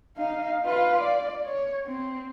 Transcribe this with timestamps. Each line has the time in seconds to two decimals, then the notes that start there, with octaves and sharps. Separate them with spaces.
0.17 D#4 F5
0.65 F4 B4
1.01 D5
1.45 C#5
1.86 C4